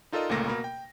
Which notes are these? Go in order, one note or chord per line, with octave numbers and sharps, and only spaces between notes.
D#4 F4 A4 A#4 D5 D#5
G1 C#2 A#2 A3 A#3 A#6
B2 A#3 A#4 B5
G5